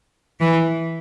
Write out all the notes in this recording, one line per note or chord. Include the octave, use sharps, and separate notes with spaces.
E3